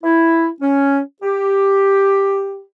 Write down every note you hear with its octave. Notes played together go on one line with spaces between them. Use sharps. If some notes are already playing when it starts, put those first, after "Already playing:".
E4
C#4
G4